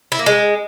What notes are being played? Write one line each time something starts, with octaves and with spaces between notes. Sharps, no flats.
E4
A#3
G#3